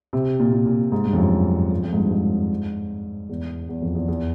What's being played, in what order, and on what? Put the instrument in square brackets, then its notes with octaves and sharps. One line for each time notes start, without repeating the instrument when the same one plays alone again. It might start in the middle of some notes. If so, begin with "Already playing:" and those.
[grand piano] C3
A#2
A#2
A#2
G#2
G2
F2
F#2
F2
F2
G#2
G2
G#2
E2
E2
F2
E2
E2